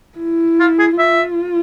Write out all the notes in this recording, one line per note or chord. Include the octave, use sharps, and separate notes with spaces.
E4
F4
G#4
F4 E5